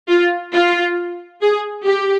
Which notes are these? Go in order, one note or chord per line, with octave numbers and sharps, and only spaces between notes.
F4
F4
G#4
G4